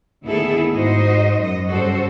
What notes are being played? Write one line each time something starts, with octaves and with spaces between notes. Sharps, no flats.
D2 D#3 B3 E4 G#4 A4
G#2 D#4 F#4 C5 D#5
F#2 F#3 D#5
G2 C#3 G3 F#4 A4 C5